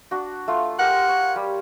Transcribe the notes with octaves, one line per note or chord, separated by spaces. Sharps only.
D4 F#4
A3 F4
G4 A#4 F#5
C#5
G3